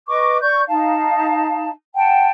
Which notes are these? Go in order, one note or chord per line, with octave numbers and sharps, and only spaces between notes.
B4 D#5 C#6 D6
D5 C#6 G6
D#4 F5 A5
F#5 G5 A5